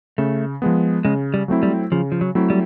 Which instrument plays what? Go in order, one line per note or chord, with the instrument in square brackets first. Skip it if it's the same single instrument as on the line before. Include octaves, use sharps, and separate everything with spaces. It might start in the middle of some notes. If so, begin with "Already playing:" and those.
[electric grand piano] C#3 [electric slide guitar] A3
[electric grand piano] F3 G#3 B3
[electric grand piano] C#3 [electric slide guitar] G#3
[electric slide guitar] G3
[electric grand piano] F#3 A3 C4 E4
[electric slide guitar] G3
[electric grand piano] C#3 [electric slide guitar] F3
[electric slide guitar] F3
F#3
[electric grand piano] F#3 A3 C4 E4
[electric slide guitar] G3